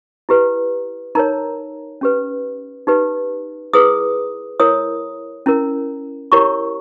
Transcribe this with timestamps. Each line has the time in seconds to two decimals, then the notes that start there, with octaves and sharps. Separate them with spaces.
0.29 E4 G4 B4
1.15 D#4 A#4 C#5 A#5
2.01 C#4 G4 B4
2.87 D#4 G4 B4
3.73 E4 G#4 B4 D#6
4.60 E4 A#4 C#5 D#6
5.46 C#4 E4 A#4
6.32 E4 G4 A#4 C#5 C#6